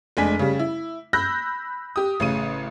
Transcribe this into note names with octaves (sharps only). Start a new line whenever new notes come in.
F1 G#3 D4 G#5 B6
C#3 G3
E4
B5 E6 F#6 G6 A#6
G4 D#6
A1 C#3 D#7